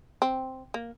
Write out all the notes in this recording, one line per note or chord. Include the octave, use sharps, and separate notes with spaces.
C4
A#3